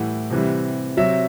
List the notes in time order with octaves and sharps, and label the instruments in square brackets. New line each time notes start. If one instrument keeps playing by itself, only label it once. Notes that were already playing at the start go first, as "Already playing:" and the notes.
Already playing: [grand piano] A2 E3 G3 F#5
C3 E3 G3
C3 F#3 E5